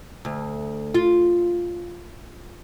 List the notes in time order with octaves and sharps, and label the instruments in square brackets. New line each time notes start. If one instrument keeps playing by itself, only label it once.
[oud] D2
F4